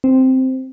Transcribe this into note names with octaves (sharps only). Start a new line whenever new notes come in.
C4